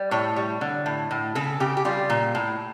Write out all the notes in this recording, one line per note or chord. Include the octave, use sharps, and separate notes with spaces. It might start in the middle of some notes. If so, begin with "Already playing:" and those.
Already playing: G3
A2 C#5
G3
D3
A2
A2
C#3 A4
C#3 G4
G4
G3 F4
A#2
A2